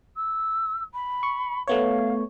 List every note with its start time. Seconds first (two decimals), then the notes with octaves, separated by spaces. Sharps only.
0.16 E6
0.94 B5
1.23 C#6
1.67 A3 B3 C#5 F5